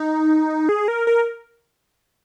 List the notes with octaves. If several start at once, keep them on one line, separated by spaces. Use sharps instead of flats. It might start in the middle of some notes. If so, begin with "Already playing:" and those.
Already playing: D#4
G#4
A#4
A#4